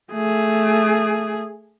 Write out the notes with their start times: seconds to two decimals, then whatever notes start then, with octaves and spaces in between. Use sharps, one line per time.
0.12 A3 G#4